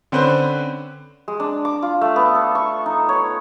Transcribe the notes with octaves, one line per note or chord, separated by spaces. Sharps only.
D3 C4 C#4 B4 C5
G#3
D4
D6
F4
A3
B3
A4
C#6
D#4
C#5